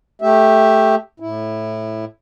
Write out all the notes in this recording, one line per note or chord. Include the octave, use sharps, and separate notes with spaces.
A3 G4 E5
A2 E4